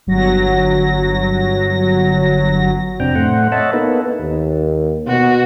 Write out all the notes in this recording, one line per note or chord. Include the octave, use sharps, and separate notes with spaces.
G1 F#3 A#6
F2 C3 C4 D4 G5 A#5
A2 A3 C5 F#5
C#5 D#5 E5 F#5 A5
A#3 B3 D#4 A4 B4
D#2
B2 F#4